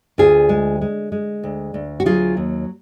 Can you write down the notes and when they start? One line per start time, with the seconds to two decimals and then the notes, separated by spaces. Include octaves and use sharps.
0.18 D2 F4 G#4
0.49 G#3
0.81 G#3
1.12 G#3
1.44 D2
1.74 D2
2.00 F#4
2.06 F#3 F4 G#4
2.37 D#2